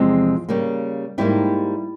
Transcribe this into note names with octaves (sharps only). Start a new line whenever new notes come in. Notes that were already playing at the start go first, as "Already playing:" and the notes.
Already playing: E2 C3 F3 G#3 C4
C#3 G3 A#3
G#2 G3 A#3 E4 G4